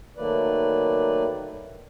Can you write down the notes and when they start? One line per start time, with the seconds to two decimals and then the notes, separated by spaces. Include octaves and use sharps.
0.17 D#3 F#3 A3 A#3 B4 D5